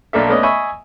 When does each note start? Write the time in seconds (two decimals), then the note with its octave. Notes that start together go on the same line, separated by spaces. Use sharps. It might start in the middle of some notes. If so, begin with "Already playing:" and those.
0.13 B1 A#3 D4 A4 E5
0.29 A3 B3 C#4 D5 D#5
0.43 D#5 E5 G#5 B5 C#6 E6